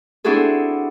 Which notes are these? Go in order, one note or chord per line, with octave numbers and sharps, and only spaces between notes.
C4 D4 E4 F#4 G#4 A4